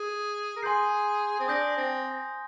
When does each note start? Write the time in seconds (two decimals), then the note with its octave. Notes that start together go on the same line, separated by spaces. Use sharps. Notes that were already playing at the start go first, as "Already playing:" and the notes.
Already playing: G#4
0.56 A#4
0.62 G#4 G#5 C6 D#6 G6 C7
1.40 C4
1.48 D4 D#6 G6 A#6
1.77 C4